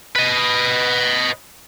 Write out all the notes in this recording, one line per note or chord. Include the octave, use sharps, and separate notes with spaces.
B4 D#5